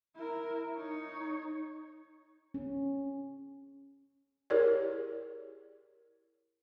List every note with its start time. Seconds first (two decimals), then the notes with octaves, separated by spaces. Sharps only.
0.16 E4 A#4
0.77 D#4 C#5
2.54 C#4
4.50 E4 G4 G#4 A#4 C#5 D5